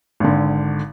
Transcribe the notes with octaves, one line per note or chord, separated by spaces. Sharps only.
G#1 D3